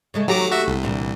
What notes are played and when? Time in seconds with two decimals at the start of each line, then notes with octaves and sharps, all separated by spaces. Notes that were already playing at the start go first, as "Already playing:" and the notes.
0.14 C#3 G#3 A3
0.28 D#2 F#3 A3 G4 A#5 D6
0.51 F#4 E5
0.68 C2
0.83 D2 A#2 E3